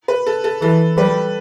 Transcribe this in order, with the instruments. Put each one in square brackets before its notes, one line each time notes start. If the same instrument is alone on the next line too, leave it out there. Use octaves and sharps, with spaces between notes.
[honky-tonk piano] B4
A4
A4
[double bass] E3 [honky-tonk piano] A4
[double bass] G3 [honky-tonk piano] B4